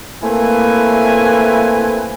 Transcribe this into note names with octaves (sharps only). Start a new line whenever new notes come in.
A3 A#3 C4 E4 B4 G#5